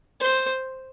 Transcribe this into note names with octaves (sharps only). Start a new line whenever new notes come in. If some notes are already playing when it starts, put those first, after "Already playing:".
C5